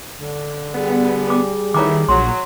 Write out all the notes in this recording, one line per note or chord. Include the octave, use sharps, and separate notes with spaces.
D3
G3 B3 G#4
D6
D#3 A3 B3 E4 C#5 A#5 D6
A#1 F#3 C6